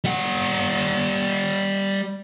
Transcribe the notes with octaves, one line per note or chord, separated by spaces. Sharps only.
G3 F#5